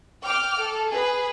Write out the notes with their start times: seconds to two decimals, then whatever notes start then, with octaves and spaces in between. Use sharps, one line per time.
0.22 G5 D6 F6
0.60 A4
0.91 G#4 B4